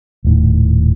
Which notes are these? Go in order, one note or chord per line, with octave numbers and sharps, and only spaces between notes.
D#1 A2 D#3